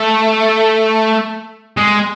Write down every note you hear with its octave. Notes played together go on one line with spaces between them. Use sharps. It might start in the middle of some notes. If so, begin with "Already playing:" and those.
Already playing: A3
G#3